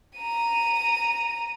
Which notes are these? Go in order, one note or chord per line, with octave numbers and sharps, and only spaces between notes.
A#5 D#7